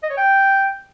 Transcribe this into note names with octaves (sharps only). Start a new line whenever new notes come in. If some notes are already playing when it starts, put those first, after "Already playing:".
D#5
C#5
G5